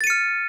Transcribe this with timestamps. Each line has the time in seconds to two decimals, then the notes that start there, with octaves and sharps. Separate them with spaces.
0.01 A6
0.04 D#7
0.07 C#7
0.10 F6